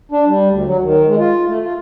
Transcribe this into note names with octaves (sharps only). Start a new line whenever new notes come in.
D4
G3
D2
F#3
D#3
G#3
F4
A3
F4